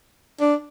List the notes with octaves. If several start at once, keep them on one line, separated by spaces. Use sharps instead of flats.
D4